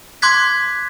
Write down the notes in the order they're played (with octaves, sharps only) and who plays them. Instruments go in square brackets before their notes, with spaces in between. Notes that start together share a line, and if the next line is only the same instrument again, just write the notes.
[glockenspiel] C6 D6 F#6 G#6 B6